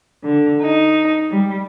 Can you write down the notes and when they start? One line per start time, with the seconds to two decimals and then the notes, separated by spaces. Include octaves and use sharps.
0.24 D3
0.61 D#4
1.30 G3